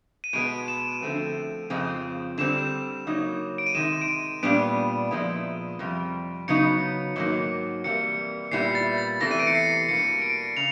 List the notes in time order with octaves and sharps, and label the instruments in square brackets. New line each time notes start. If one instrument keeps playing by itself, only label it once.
[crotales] D#7
[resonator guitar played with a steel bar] B2 G#3 B3 [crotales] D7
[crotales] E7
[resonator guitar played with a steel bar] D3 F3 A3 C4
F2 C#3 F3 G#3 C4
[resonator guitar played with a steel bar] D3 G3 C4 [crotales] E7
[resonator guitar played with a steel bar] C#3 F#3 A#3 D#4
[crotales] D7
D#7
[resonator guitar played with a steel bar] C3 D#3 G#3 [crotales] E7
[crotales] D7
D#7
[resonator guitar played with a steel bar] A#2 G3 B3 D4 [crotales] D7
[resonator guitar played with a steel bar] A#2 F3 G#3 B3 E4
F2 C3 G3
[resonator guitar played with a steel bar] C#3 F#3 B3 D#4 [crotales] C#7
[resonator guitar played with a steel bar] G#2 D#3 F#3 A#3
[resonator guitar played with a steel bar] C3 E3 G3 A#3 [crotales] C#7
[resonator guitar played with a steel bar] A#2 G3 B3 E4 [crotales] C7
[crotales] A6
A6
[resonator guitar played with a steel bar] E2 C3 E3 A3 [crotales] A#6
[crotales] D#7
D7
C#7
C7
[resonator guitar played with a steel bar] B2 G3 A#3 D4 [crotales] C#7
[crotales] D7
[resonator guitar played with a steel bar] C#3 [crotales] F7